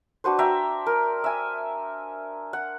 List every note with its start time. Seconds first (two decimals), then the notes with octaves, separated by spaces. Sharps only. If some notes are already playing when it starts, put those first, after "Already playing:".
0.24 D4 F#4 B4 C5
0.39 E5 G5 A#5
0.86 A#4
1.24 E5 G#5
2.53 F#5